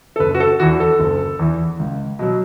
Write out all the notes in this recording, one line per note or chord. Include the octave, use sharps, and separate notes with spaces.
A4
F#1 B4
F#4
A4
E2 E3 F#4
A4
F#1
E2 E3
C#2
B2 F#3